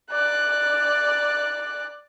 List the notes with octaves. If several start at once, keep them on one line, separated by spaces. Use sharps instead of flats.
D5 F#6